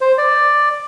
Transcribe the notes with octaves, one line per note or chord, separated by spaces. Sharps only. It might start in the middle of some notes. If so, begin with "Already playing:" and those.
C5
D5